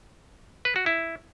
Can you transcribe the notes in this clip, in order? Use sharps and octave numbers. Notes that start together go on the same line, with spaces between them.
B4
F#4
E4